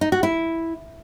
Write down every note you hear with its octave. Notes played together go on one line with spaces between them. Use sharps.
D#4
F#4
E4